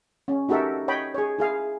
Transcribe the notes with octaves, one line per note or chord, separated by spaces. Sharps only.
C#4
D#4 F#4 G4 A4 A#4 E5
C#5 D#5 G5 B5
G#4 C#5
E4 G#4 F5